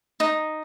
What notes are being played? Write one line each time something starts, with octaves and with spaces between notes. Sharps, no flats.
D#4